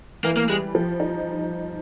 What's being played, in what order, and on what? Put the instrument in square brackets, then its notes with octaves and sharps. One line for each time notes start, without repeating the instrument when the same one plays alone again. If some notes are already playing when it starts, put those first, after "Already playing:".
[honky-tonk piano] E3 [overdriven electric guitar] A#3
[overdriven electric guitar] A#3
[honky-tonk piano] G3 [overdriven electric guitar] G#3
[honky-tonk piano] F3
D#4